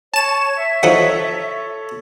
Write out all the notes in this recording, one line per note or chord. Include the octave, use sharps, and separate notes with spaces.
C#5 A5 E7
E5
F3 D#4 A4 C#5 F#5